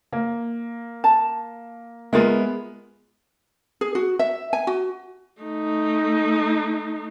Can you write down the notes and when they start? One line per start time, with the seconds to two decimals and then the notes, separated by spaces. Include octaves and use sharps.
0.13 A#3
1.04 A5
2.13 G#3 B3 F4 A#4 E5
3.81 G#4
3.95 F#4
4.19 E5
4.53 G#5
4.67 F#4
5.42 A3 D#4